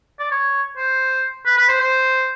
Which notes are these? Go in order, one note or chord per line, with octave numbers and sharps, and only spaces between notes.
D5
C#5
C5
B4
B4
C5
C5